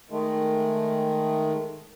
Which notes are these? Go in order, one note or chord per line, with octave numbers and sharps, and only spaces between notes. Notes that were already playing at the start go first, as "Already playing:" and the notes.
D#3 G#3 A3